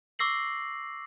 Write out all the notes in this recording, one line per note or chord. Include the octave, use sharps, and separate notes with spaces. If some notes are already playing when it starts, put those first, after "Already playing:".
C#6 D6 E6 A#6 C7 F#7